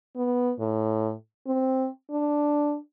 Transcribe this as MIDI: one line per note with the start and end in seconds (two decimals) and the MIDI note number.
0.16 0.53 59
0.59 1.13 45
1.47 1.89 60
2.11 2.77 62